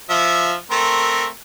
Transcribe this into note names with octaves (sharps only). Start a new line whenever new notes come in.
F3 E5
A3 C4 A#4